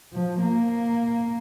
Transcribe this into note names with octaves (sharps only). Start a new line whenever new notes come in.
F3
A#3